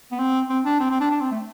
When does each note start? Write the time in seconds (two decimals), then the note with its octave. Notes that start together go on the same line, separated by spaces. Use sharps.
0.12 B3
0.19 C4
0.49 C4
0.65 D4
0.80 C4
0.90 C4
1.00 D4
1.11 D4
1.20 C4
1.31 A3